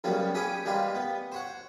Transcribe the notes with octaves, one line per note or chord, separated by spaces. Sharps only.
F#2 C#3 G3 A#3 B3
C#4 G4 G#4 B4 G5 D6
G3 G#3 A#3 G4 B4
B3
C5 C#5 F#5